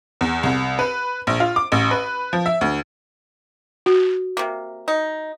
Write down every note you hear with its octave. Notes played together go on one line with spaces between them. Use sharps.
E2
C2
B4
A#1
F4
D6
A1
B4
F3
E5
D2
F#4
C3 A#3
D#4